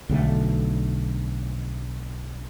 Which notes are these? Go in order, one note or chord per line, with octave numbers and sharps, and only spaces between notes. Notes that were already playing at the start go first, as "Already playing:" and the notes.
B1 D3 G3 A3